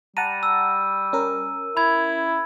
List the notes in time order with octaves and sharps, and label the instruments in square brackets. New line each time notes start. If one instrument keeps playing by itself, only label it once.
[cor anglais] G3 [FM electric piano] F#5 A5 A#5 [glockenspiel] D#7
[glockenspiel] E6
[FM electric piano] C#4 A#4
[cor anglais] E4 [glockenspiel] B5 G#6